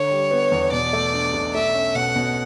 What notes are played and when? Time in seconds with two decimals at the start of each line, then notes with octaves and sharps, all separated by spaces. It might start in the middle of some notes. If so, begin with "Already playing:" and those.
Already playing: D3 C#5
0.11 G3
0.31 B3
0.52 E2
0.72 B2 D5
0.93 A3
1.13 D4
1.34 B1
1.54 A3 E5
1.75 C#4
1.95 B2 F#5
2.16 B2